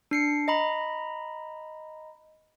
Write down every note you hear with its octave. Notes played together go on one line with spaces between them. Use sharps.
D4 C7 C#7
D#5 A#5 B5